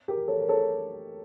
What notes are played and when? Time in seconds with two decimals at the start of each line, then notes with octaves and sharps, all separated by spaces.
0.08 G4 A#4
0.28 A4 C#5
0.40 A#4
0.49 A4 C#5